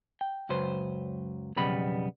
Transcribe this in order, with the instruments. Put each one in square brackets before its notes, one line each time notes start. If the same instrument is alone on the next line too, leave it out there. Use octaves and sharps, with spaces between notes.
[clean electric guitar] G5
C#2 F#2 F#3 B4 C5
B1 F2 C#3 G3 B3 B5